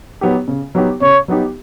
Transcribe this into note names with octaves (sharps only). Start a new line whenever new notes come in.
F#3 B3 D#4 G4
C#3
F#3 B3 D#4 G4
C#3 C#5
F#3 B3 D#4 G4